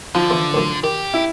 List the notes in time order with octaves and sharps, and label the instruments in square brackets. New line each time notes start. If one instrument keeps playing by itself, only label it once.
[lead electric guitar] D3 [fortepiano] F3
[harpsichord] E2 E3
A1 F#2
[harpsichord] D#3 [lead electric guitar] G4
[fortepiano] E4